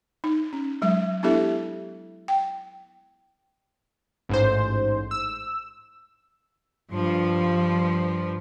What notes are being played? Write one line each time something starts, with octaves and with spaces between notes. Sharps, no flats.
D#4
C#4
F#3 G#3 E5
B3 D4 E4 G4 A4 E5
G5
A1 G#2 C5
E6
G2 F3